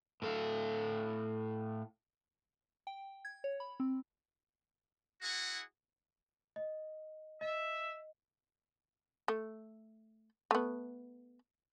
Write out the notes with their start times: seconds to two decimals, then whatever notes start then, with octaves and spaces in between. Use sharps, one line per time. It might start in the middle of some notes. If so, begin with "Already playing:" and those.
0.22 A2 A4 F5
2.87 G5
3.25 G#6
3.44 C#5
3.60 B5
3.80 C4
5.22 E4 F#4 G#4 F#5
6.56 D#5
7.41 D#5 E5
9.28 A3
10.51 A3 B3